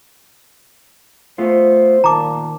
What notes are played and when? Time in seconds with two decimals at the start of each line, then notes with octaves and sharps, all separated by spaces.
1.38 A3 B3 F4 C5
2.04 A#2 D#3 A5 A#5 D6